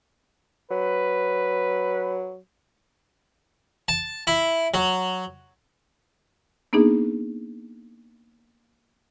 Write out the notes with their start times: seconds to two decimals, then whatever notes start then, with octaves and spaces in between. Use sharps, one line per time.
0.71 F#3 B4
3.88 A5
4.27 E4
4.74 F#3
6.73 A#3 B3 D4 D#4 G#4